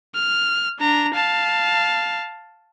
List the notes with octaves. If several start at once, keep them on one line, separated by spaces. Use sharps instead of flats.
F6
D4 A#5
F5 A5